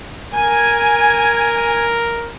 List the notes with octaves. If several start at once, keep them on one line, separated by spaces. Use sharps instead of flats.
A#4 G#5